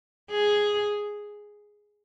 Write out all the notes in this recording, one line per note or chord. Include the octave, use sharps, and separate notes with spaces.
G#4